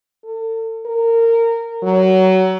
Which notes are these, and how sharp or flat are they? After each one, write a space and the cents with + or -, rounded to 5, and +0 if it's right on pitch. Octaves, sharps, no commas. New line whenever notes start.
A4 +40
A#4 -20
F#3 +25